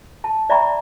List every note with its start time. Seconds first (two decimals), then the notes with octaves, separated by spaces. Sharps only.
0.24 A5
0.50 D5 E5 G5 A#5 B5 C#6